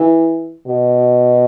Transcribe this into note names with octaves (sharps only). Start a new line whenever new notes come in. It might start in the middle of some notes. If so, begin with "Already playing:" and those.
Already playing: E3
B2